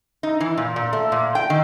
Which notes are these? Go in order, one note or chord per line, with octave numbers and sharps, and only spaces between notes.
D#4
E3
A#2
A#2
A3
A#2
G5
D#3